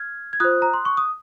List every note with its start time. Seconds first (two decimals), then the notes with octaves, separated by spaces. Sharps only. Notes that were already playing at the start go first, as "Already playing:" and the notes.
Already playing: F6 G#6
0.33 G#6
0.40 F4 C5 D#6 F#6
0.62 A#5
0.74 C6
0.85 C#6
0.97 D#6